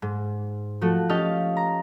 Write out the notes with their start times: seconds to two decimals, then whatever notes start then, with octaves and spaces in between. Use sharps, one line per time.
0.02 G#2
0.81 F3 A3 F#4
1.09 C#4 G4 D#5 F5 A5
1.57 A#5